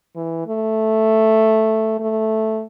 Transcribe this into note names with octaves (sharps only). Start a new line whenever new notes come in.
E3
A3
A3